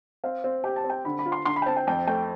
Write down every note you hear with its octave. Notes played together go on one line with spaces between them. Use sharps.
C4 F5
C4
G4 G5
A5
C4
G5
D3 B5
B5
F4
C6
D3 C6
B5
G5
C4 A5
G5
F2 G5
A3 G5